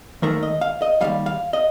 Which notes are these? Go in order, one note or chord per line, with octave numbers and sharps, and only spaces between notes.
D#2 D#3 A3 A#4
D#5
F5
D#5
D#2 D#3 G3 F5
F5
D#5